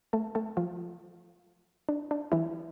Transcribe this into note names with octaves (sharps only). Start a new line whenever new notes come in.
A3 A4
A3 A4
F3 F4
D4
D4
E3 E4